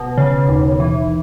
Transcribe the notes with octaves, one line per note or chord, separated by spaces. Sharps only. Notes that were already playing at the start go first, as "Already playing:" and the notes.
Already playing: B2
C#3
D#2
E3